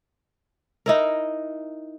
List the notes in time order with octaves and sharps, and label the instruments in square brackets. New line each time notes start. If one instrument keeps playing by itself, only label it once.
[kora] D#4 E4 A#4